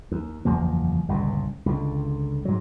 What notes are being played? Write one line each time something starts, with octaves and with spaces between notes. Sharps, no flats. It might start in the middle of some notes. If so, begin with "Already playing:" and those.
D#2
F#1 E2 F3 A#3
G1 C#2 A#2
C#2 D3
G#2 F#3